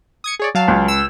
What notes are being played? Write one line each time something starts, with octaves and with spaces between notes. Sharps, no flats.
D#6 G#6 C#7
G#4 C#5 D5
F#3 F5 A5
C#2
E6